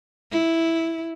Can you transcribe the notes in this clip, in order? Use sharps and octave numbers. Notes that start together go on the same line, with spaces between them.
E4